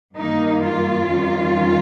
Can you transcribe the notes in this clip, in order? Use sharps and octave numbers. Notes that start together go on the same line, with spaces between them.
G2 D#3 A#3 D#4
F4
F2 D#3 G3 C#4